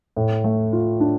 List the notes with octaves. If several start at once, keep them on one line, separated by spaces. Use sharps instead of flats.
A2
A3
F4
D4